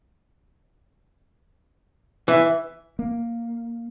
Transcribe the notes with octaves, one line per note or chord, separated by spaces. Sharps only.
E3 E5
A#3